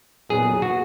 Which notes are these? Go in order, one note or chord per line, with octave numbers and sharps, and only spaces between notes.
A#2 F#3 B3 D#4 G#4
F#4